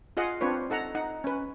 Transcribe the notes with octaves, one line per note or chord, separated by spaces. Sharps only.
F4 G#4 D#5 F5 F#5
C4 D4 F4 B4 C#5
D#4 A4 F#5 A#5
D#4 F#5
C#4 B4